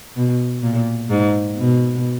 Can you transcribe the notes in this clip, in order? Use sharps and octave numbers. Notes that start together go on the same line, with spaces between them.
B2
A#2
G#2
B2